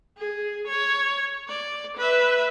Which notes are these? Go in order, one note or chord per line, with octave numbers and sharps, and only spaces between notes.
G#4
C#5
D5
B4 E5